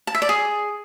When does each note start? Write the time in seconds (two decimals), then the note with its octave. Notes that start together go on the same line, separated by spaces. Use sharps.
0.07 A5
0.15 E5
0.22 D5
0.29 G#4